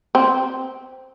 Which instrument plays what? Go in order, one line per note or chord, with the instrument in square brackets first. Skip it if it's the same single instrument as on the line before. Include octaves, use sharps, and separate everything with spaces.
[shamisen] C4